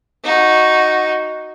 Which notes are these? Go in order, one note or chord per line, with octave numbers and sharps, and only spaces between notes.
D#4 F#4